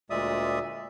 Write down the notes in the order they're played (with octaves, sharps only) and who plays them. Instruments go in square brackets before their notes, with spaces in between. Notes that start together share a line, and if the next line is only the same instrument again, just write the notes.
[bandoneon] D2 A#2 G#3 D5 E5 D#6